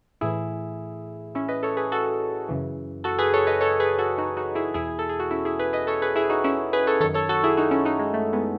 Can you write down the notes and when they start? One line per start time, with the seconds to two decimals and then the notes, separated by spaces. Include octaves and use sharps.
0.21 A2 E3 E4 G#4
1.35 C#4 E4
1.48 B4 D#5
1.63 A4 C#5
1.77 G#4 B4
1.92 F#4 A4
2.49 F#2 C#3 E3
3.04 F#4 A4
3.19 G#4 B4
3.34 A4 C#5
3.47 B4 D#5
3.61 A4 C#5
3.80 G#4 B4
3.99 F#4 A4
4.18 D#4 F#4
4.37 D#4 F#4
4.55 E4 G#4
4.74 E2 B2 E4 G#4
4.99 A4
5.09 G#4
5.20 F#4
5.31 C#4 E4
5.45 E4 G#4
5.59 G#4 B4
5.73 B4 D#5
5.87 A4 C#5
6.02 G#4 B4
6.16 E4 G#4
6.29 D#4 F#4
6.44 C#4 E4
6.73 G#4 B4
6.87 A4 C#5
7.00 D#3 A4 C#5
7.04 F#2
7.14 A4 C#5
7.29 F#4 A4
7.44 E4 G#4
7.57 D#4 F#4
7.71 C#4 E4
7.85 D#4 F#4
7.99 G#3
8.14 A3
8.33 G#3 B3